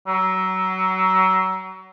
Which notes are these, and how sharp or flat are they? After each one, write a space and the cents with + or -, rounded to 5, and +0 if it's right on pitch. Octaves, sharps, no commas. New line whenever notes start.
F#3 +25